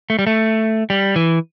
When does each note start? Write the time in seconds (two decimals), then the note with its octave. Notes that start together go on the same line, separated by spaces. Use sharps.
0.10 A3
0.19 G3
0.27 A3
0.90 G3
1.16 E3